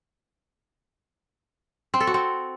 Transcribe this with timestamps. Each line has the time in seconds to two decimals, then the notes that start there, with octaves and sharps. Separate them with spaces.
1.94 C4
2.00 A4
2.07 F#4
2.14 C4